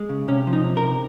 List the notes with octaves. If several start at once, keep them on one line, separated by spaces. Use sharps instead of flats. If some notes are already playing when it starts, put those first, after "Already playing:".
Already playing: G#3
C#3
C3 C#4
F3
D#4
C3
A#4
C3